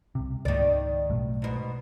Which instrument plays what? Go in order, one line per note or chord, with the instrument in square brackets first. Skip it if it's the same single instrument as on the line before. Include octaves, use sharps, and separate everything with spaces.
[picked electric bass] C2 C3
[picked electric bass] C#2 G#2 A#3 [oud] D#3 D5
[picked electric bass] B1 A2
[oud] G#2 B2